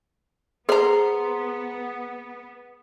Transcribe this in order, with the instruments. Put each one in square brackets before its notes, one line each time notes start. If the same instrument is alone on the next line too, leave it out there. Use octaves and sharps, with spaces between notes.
[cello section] B3 [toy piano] G#4 C5 [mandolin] A#5 C6